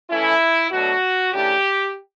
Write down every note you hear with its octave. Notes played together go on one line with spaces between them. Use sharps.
E3 A3 C#4 E4
B2 F#3 A3 D4 F#4
C#3 E3 A3 D4 G4